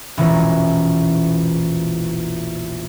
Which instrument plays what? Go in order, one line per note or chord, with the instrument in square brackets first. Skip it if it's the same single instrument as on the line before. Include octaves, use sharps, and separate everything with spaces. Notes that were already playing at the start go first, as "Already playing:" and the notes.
[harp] E1 A#1 E3 G#3 C#4